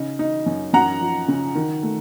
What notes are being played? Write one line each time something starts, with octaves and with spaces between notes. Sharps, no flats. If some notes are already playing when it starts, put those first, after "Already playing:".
Already playing: C#3 D#4
D#4
F#2
F#2 F#5 A#5
F3
C#3
D#3
A3